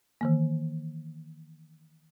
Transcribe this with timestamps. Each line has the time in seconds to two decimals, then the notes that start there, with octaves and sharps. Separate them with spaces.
0.21 D#3 E3 A#3